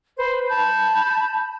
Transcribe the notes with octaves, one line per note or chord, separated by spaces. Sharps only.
B4 C5
A5 B5 G6